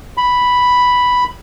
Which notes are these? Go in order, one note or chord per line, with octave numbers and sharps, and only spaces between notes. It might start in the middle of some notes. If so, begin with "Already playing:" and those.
B5